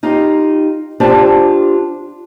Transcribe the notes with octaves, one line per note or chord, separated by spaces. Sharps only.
D#4 F4 G4
D4 F4 G4 C5 A5